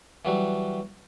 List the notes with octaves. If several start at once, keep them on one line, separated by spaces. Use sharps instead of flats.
E3 F#3 G3